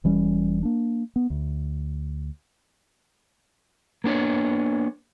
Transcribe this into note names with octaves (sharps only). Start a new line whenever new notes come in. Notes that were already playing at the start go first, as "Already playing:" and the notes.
E1 E3 G3 C#4
A#3 D4
B3
D2
A#3 B3 D4 C#5